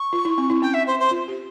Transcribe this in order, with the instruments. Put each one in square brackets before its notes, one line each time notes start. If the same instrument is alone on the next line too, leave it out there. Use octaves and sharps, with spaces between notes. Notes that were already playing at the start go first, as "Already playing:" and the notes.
Already playing: [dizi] C#6
[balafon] F4
E4
C4
E4
[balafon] C#4 [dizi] G5
[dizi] E5
C5
C5
[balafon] F4
G4